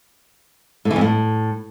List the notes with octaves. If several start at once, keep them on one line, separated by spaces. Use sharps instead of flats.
A2
E3
F2
A2